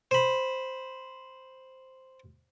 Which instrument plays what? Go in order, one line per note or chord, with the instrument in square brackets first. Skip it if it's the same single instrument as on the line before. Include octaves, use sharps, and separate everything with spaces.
[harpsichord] C5 B5